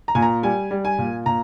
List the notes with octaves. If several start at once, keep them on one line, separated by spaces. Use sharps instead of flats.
A#5
A#2 G#5
A#5
G3 G#5
G3
G#5
A#2
A#2 A#5